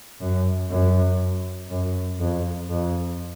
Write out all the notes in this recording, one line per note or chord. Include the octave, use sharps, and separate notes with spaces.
F#2
F#2
F#2
F2
F2